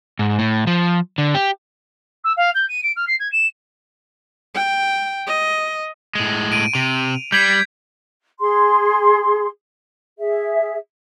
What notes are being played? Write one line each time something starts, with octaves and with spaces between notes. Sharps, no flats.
G#2
A2
F3
D3
G4
E6
F5
G6
D#7
D7
F6
C7
G#6
E7
G5
D#5
A2 G#3
D7 D#7
C3 F7
G3 G6 G#6 B6
G#4 C6
G#4 E5